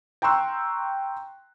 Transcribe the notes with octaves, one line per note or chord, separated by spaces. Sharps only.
G5 A#5 C6 C#6 E6 F#6